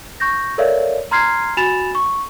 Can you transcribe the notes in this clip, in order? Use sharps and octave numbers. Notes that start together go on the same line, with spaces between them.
C#6 G6 A#6
A4 A#4 C#5 D5 E5 F5
A#5 C6 F6 G#6 C7
F#4 G#5 B5 A6 E7 F7
C#6